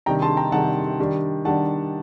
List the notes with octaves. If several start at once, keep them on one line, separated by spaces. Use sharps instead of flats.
C3 D#3 G3 D4 G5 A#5
A5 C6
G5 A#5
C3 D#3 G3 D4 F#5 A5
D#3 G3 D4
D#3 G3 D4 F#5 A5